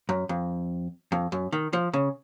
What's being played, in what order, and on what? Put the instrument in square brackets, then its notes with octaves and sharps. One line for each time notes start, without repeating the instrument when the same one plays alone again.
[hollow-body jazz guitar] F#2
F2
F2
F#2
D#3
F3
C#3